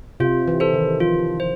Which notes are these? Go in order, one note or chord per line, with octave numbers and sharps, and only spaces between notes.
C3 F4
E3
A4 C5
D#3
F3 F4
C5